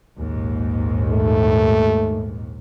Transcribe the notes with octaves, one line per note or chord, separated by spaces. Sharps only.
A#1 D#2 G#2
A3